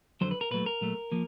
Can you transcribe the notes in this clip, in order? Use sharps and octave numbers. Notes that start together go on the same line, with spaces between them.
F2 D3 F#3 C5
B4
A#4
A#2 F#3 A3 B4
A#4
A#2 F#3 A3
F3 A#3